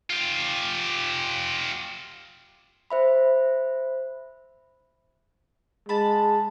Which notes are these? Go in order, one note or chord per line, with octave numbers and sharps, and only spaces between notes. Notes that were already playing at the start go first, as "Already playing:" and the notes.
F4 G4
C5 E5 B5
G#3 A5 B5